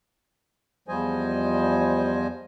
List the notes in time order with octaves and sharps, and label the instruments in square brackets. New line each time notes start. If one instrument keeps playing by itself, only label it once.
[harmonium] E2 F3 G3 C5 D#5 G#5